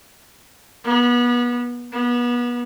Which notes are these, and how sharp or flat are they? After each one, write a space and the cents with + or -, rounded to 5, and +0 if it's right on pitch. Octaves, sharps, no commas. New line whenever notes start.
B3 -30
B3 -30